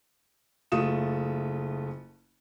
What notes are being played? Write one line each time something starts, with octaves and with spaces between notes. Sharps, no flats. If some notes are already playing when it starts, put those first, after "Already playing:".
F#1 A3 F4 D#6 E7